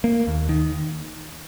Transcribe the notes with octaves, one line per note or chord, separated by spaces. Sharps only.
A#3
D#2
D#3